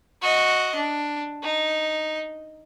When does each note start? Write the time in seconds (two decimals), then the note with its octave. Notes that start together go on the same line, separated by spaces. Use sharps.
0.22 F#4 D#5
0.75 D4
1.43 D#4